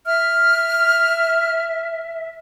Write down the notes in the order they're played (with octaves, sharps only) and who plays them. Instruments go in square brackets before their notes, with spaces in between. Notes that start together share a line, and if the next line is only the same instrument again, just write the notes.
[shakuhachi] E5 [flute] F6